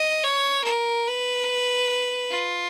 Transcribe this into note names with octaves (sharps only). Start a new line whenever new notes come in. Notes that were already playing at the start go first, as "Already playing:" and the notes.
Already playing: D#5
C#5
A#4
B4
F4